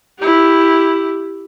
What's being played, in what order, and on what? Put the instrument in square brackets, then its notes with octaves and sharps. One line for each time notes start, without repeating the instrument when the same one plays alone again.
[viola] E4 G4